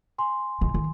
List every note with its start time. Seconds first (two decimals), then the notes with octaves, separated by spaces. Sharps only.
0.18 G#5 C6
0.61 D#3
0.74 D#3